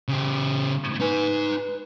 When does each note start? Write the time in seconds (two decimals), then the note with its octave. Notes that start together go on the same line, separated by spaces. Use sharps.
0.08 C#3 G4
1.00 D#4 B4 G#5